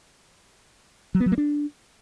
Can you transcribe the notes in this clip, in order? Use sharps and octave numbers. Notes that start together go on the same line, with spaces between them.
F#3
B3
F#3
A#3
D4